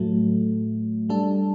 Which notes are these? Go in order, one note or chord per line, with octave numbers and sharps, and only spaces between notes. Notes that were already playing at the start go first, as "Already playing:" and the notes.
Already playing: A2 F#3 A3
G3 D4 A4